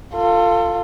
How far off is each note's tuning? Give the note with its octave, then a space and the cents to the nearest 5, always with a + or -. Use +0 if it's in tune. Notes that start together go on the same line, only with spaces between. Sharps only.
F4 +0 A4 +30